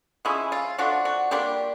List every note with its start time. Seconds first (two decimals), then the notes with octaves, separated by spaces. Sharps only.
0.25 F3 G#3 C#4 E4
0.52 F4
0.78 F3 A3 D4 F4 F#4
1.05 F#4
1.31 G3 A#3 D4 F4 G4